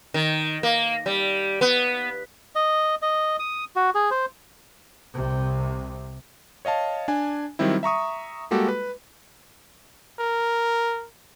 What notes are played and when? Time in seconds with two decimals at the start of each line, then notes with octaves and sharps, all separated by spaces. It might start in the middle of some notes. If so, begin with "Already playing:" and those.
0.14 D#3
0.63 A#3
1.06 G3
1.61 B3
2.56 D#5
3.02 D#5
3.39 D#6
3.76 F#4
3.95 G#4
4.11 C5
5.14 C2 C3
6.65 C#5 D#5 F5 A5
7.08 D4 G#5
7.59 D#3 F#3 G3 C4 E4
7.83 E5 A#5 C#6 D#6
8.51 G3 G#3 A#3 F#4 G4 A4
8.68 B4
10.19 A#4